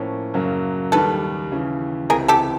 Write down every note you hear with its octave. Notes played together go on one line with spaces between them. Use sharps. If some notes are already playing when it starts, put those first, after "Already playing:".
Already playing: A2 F3 A#3 C#4
F#2 C#3 F#3 A#3
D#2 D#3 G3 A4 B4
D#2 C#3 E3
C#2 C3 E3 G#4 A#4
G4 A4